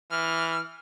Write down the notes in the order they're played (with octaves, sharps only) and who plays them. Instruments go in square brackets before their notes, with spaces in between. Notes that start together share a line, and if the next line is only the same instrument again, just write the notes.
[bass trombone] E3 [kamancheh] F6